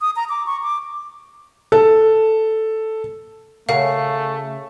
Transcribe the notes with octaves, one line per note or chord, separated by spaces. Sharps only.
D#6
A#5
D6
C#6
D6
A4
C#3 A3 F#4 A#4 F5